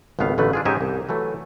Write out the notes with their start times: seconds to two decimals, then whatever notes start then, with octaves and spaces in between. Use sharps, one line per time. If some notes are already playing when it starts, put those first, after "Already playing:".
0.19 G#1 C#2 A3 B3 F5
0.38 A1 D3 F#3 A3 B3 B4
0.53 D4 F4 G#4
0.65 G#2 C#4 D#4 G4 E5 G#5
0.81 C2
1.09 E3 F#3 A3